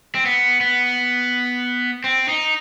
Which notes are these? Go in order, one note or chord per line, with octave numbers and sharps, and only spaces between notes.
C4
B3
B3
C4
D#4